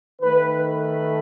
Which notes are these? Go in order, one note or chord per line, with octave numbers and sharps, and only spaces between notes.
D#3 A3 B4
B4